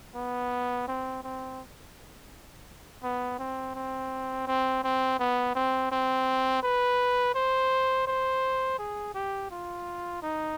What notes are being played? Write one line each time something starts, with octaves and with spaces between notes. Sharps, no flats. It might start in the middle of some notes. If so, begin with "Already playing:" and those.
B3
C4
C4
B3
C4
C4
C4
C4
B3
C4
C4
B4
C5
C5
G#4
G4
F4
D#4